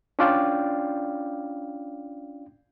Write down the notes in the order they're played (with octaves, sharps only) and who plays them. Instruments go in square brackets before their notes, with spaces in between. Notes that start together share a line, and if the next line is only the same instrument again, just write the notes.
[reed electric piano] C#4 D4 F4 D5 F5 G5